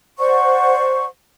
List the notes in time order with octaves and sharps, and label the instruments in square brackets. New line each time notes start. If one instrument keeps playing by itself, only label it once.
[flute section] C5 D5 F#5 C#6